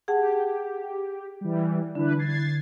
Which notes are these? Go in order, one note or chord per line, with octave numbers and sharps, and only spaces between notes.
G4 G#4 F#5 A5
E3 G3
D3 D4 E4 B4
G#6 A6 C7